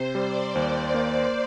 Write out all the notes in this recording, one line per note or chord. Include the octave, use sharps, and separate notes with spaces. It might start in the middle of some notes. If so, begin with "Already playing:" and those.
Already playing: C3 C5
G3 D5
D#2
A#3